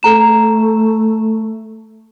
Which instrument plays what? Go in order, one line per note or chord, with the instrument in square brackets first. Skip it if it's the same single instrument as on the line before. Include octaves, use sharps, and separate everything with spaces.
[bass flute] A3 [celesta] A4 A#5 E7